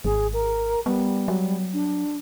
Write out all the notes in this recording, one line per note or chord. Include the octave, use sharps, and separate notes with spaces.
G#1 G#4
A#4
G3 B3
F#3
D4